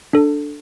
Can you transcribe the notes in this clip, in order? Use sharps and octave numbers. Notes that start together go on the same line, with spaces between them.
D4 A4